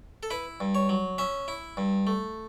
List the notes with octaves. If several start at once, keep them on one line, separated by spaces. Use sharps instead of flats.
A4
E4 B4
G2
C#5
F#3
C#4 E5
E4
G2
A3